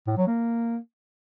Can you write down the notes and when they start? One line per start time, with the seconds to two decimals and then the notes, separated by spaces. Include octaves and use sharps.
0.07 A2
0.17 F#3
0.27 A#3